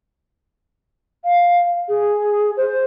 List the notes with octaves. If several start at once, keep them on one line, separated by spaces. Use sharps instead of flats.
F5
G#4
C5